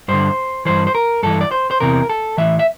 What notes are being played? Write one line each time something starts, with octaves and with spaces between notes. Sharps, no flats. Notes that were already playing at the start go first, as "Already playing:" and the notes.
G2 D3 C5
G2 E3 C5
C5
A#4
G2 E3 A4
D5
C5
C5
E2 C3 E3 A#4
A4
A2 E3 E5
E5